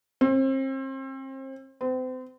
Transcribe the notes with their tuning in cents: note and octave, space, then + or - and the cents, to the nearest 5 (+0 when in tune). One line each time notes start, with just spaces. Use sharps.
C4 +35
C4 -35